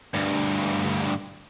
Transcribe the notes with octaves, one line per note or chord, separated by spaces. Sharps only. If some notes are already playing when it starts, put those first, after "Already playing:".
D2 G2